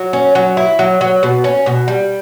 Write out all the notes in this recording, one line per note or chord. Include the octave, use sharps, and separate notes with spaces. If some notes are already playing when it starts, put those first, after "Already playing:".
Already playing: F#3
C#4
F#3
E4
F#3
F#3
B2
C#4
B2
G3